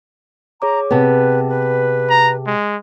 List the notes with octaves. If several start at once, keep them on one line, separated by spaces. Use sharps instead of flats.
G#4 C#5 A#5 D6
C3 B3 G#4 B4 A5
B4
A#5
G#3